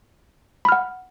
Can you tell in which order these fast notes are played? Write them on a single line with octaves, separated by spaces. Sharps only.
B5 F6 F#5